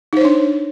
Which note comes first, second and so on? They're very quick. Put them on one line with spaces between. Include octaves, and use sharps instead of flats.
D#4 C5 C#5 D4